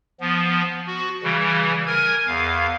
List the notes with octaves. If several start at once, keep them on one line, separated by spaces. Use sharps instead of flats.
F3 B3
F#4
C#3 E3 G3
A#4 G#5 G#6
E2 F5